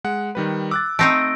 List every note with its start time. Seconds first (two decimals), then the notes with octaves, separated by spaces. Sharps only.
0.04 G#3 F#5
0.35 D#3 G3 B4
0.71 D6 E6 F#6 A6
0.99 A3 C4 D#4 E6 A#6 D7